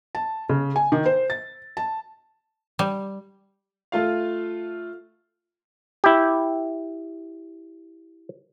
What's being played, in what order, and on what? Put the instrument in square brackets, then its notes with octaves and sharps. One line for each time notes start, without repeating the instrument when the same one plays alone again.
[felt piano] A5
C#3
G#5
D#3
C5
A6
A5
[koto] G3
[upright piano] A3 F4 F5
[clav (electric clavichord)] E4 G4